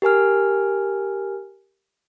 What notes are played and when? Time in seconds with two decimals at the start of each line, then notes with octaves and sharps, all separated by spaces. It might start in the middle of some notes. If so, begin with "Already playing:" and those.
0.02 G4 A#4 G#5 F6